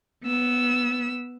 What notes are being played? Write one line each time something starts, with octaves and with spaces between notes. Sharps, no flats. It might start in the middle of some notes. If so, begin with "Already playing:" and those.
B3 E6